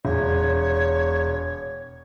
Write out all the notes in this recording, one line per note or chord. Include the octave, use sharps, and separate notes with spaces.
E1 C#5